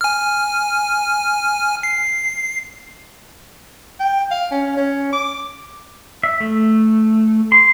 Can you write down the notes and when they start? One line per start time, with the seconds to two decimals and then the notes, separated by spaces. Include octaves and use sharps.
0.01 G#5 F6
1.83 C7
4.00 G5
4.31 F5
4.52 C#4
4.77 C#4
5.13 D6
6.23 E5
6.40 A3
7.52 C6